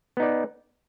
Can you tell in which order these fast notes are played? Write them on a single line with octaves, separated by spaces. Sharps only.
B3 D#4 D5